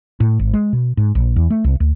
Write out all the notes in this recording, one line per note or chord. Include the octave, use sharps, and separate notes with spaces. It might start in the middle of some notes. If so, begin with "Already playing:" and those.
A2
G#1
G#3
B2
G#2
A#1
E2
A3
C2
D2